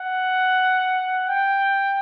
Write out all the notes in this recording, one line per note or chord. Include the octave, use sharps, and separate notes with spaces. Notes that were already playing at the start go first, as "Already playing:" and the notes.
Already playing: F#5
G5